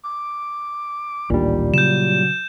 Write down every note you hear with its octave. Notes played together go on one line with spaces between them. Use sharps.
D6
A1 D2 A#2 D#3 G3 D4
C#3 F#3 G6 E7